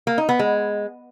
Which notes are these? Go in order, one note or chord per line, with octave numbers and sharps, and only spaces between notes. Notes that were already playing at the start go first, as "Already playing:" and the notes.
A#3
D#4
B3
G#3